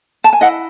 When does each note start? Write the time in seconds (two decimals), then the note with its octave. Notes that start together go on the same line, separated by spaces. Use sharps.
0.24 A5
0.33 G#5
0.41 E4 D#5 F#5